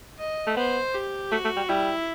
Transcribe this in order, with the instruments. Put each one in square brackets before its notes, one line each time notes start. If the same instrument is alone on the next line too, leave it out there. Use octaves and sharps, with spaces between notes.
[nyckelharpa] D#5
[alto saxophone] A3
[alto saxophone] B3 [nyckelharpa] C5
[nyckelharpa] G4
[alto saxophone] A3 [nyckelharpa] F#4
[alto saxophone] A3
G3
[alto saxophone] G3 [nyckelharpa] E4